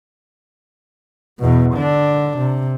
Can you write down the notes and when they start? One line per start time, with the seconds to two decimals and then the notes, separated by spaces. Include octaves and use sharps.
1.39 E2 B2
1.74 D3 D4
2.37 C3